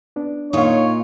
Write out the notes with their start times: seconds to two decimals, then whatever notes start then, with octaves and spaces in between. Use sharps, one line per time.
0.16 B3 D4
0.53 A#2 D#4 F4 C#5 F5